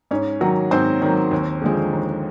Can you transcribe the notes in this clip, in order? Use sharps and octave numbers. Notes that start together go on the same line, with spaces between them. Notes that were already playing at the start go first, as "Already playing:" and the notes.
G#2 C#4
D#3 F#3 F#4
G#2 C4 C5
D#3 F#3
D#2
D3 F3 G#3
D#2